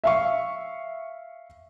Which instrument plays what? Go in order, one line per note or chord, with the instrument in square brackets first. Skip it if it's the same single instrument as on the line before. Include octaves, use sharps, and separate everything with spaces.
[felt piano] E5 F5 C#6